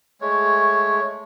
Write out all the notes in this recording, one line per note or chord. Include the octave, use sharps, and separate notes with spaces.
G#3 A3 C#5